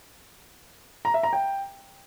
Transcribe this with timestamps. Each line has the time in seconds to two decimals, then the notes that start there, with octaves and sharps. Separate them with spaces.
1.05 A#5
1.14 E5
1.23 A#5
1.33 G5